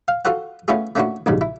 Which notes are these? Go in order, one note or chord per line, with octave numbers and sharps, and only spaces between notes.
F5
F4 F#4 A4 C5 F#5
A3 B3 C#4 E4 F4 G#4
A3 A#3 C#4 D4 E4 F#4
A#1 F2 G#2 C#3 F#3 G3
E4